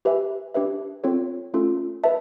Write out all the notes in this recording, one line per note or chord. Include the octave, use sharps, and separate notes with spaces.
G4 B4 E5 G#5
D4 G4 B4 E5
C4 F4 A4 C#5
A3 C#4 F4 A4
B4 E5 A5